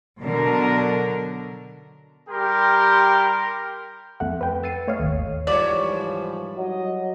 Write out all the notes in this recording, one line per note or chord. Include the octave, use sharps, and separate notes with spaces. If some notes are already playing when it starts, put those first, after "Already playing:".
B2 D3 F#3 A#4
G3 G4 A#4 G5 C6
F2 A3 F#5
B4 G5
E6 A6 C7 C#7 D#7
A3 C#5 D#5 F5
G#1 D#2
G#2 E3 F3 G3 C#5 D5
F#3 D#5